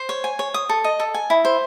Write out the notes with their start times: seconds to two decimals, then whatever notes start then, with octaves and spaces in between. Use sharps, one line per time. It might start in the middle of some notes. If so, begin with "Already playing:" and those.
Already playing: C5
0.09 C#5
0.24 G#5
0.39 C#5
0.54 D#6
0.69 A4
0.84 D#5
1.00 A4
1.14 G#5
1.30 E4
1.45 C5